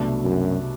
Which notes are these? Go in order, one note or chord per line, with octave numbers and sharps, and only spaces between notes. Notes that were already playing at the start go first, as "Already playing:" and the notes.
Already playing: C2 B2 F#3 A3 D4
F#2